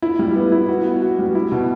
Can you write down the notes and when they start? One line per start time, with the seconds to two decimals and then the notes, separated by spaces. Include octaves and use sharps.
0.02 E4
0.19 G3
0.36 B3
0.52 E4
0.69 F#4
0.85 B3
1.02 F#4
1.19 G3
1.35 E4
1.52 B2